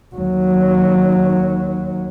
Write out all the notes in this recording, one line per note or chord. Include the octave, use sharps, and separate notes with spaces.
D#2 F#3